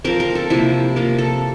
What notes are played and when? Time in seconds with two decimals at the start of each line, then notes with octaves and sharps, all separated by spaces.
0.04 F3 C4 A#4
0.20 A#4
0.35 A4
0.50 C3 F3 A#3 E4
0.96 C3 F3 A#3 A#4
1.18 A4